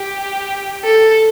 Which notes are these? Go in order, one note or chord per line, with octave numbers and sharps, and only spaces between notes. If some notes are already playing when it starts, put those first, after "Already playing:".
Already playing: G4
A4